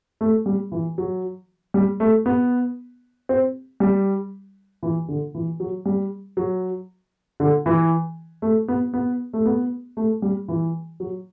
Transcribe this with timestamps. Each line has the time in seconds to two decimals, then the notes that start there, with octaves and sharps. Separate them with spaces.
0.21 A3
0.46 G3
0.72 E3
0.98 F#3
1.74 G3
2.00 A3
2.26 B3
3.29 C4
3.80 G3
4.83 E3
5.08 D3
5.34 E3
5.60 F#3
5.85 G3
6.37 F#3
7.40 D3
7.66 E3
8.42 A3
8.68 B3
8.94 B3
9.33 A3
9.45 B3
9.97 A3
10.22 G3
10.48 E3
11.00 F#3